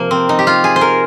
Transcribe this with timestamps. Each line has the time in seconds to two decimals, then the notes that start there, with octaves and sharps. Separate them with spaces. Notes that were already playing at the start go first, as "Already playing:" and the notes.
Already playing: C3 F3 A#3
0.11 C4
0.29 D#4
0.39 G4
0.47 F4
0.64 G#4
0.76 C5
0.81 A#4